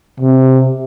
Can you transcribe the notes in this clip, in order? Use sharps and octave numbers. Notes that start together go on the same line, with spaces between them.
C3